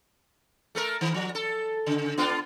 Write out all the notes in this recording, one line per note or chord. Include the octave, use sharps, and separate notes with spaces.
A3 A4 A#4
D#3
F3
A4
C#3
B3 D4 F4